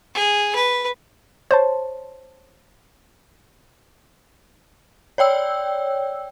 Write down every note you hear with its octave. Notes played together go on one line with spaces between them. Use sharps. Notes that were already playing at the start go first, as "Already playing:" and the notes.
G#4
B4
C5 C#5 A5
C#5 D5 G5 E6